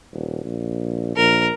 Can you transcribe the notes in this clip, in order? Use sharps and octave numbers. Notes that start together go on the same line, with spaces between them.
D#1
A#1
A#1 A#4